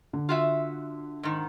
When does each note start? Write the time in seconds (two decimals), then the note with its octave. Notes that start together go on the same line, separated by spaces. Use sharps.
0.13 D3
0.29 F4 F#4 E5
1.23 G#2 D#3